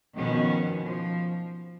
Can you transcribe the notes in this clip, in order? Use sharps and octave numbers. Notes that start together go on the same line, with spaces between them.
B2 D#3 F3 B3 C#4
F3